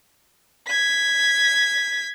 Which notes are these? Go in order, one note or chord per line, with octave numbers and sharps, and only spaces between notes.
G#6 B6